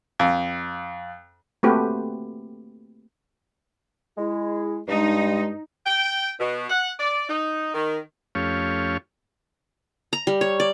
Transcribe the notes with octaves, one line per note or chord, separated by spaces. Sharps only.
F2
A3 A#3 C4 F#4 G4 B4
G#3 E4
G2 G#3 D#4
G5
B2
F#5
D5
D#4
D#3
F2 A3 C#4 G4 C#5 F5
A#5
G3
C#5
D5